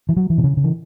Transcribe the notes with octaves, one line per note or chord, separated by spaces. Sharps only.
E3
F#3
E3
B2
C#3
C#3
E3